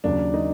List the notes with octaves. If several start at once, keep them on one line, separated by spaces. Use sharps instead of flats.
D#2 C#3 F#3 D4
D#4